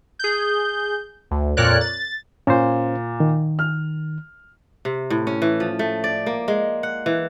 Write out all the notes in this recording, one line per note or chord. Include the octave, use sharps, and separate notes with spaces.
G#4 G6
D2
F2 A#2 A#4 C#5 D5 F#6
A6
A#2 C#4 C5
D#3
F6
C3
A2
C#4
E3
F3
A3
D5
A#3
G#3
F#5
E3